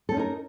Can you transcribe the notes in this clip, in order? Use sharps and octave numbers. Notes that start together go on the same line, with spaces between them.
C4 C#4 D#4 A4 A#4